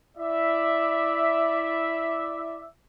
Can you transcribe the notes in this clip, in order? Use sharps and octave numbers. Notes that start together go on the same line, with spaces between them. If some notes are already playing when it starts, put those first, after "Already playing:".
E4 D5 E5